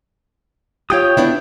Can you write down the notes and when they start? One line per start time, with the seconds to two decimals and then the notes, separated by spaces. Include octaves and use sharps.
0.90 F4 G4 C#5 G5 D#6
1.17 B3 D4 E4